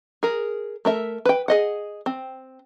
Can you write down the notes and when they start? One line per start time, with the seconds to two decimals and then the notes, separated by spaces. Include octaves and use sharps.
0.23 G#4 A#4
0.85 A3 A#4 E5
1.25 B4 G5
1.48 G#4 D#5 F#5
2.06 C4